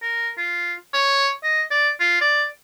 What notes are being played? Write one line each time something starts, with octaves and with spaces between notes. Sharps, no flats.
A#4
F4
C#5
D#5
D5
F4
D5